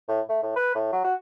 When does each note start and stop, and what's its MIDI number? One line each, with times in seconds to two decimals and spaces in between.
0.08 0.21 45
0.29 0.41 57
0.43 0.55 45
0.56 0.72 71
0.75 0.91 45
0.92 1.03 54
1.04 1.14 66